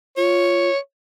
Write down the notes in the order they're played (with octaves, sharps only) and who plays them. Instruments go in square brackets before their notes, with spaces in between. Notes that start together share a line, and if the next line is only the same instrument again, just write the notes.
[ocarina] F4 [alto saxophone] C#5